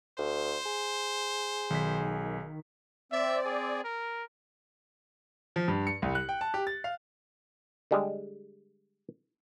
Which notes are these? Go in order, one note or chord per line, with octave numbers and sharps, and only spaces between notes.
D2 C5
G#4
B1 D#3 B6
C4 D5 E5
G#4
A#4
F3
G2
C#7
C2
F#6
G5
A5
G4
A6
F5
D3 G3 G#3